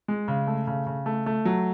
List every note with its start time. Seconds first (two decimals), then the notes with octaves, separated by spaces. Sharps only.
0.08 G#3
0.28 C#3
0.47 A3
0.67 C#3
0.86 C#3
1.06 A3
1.26 A3
1.45 F#3